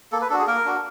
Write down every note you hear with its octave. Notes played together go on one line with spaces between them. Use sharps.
A#3 A4
B4
D4 F#4 A4
G#4
A#3 A#4
D4 F#4